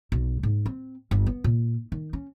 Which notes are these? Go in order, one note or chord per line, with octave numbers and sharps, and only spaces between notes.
B1
G#2
C4
G1
B3
A#2
D#3
C#4